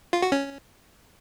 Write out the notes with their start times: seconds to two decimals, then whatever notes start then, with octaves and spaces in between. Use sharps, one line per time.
0.13 F4
0.22 F#4
0.32 C#4